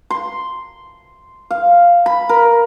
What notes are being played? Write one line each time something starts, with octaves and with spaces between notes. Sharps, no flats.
C6
F5
B5
A#4